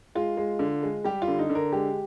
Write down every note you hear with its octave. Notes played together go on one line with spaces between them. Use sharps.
G#3 F4
G#3
D3
G#3
G3 G4
F4
D3
D#4
D3
A#4
G#3 G4